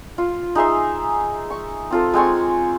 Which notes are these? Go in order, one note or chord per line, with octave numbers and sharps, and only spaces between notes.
F4
D#4 G#4 E5 C6
C#6
C4 F4 A4
G#3 C4 G#5 C#6